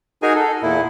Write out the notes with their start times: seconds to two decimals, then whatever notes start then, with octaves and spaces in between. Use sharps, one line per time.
0.22 D#4 F#4 G#4 A#4 G#5
0.36 A4
0.62 E2 A#2 E4